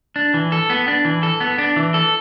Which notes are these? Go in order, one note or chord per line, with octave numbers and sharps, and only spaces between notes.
D4
E3
A4
B3
D4
E3
A4
B3
D4
E3
A4